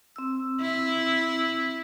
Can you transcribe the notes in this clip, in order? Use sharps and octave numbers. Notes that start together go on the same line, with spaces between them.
C4 E6
E4